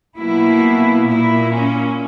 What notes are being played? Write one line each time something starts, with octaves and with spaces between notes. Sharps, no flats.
B2 F#3 A#3 E4
A#2 A#3 E4
C#4